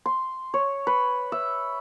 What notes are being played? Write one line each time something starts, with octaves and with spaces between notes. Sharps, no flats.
C6
C#5
B4
E5